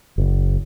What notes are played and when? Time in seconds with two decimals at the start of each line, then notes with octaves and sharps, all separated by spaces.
0.18 F#1